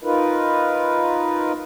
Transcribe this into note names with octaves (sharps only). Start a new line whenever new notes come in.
D#4 F4 A#4 B4